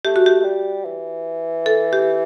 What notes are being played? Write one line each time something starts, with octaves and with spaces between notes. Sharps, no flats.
A3 G4
F#4
G4
A3
G3
E3
A4
G4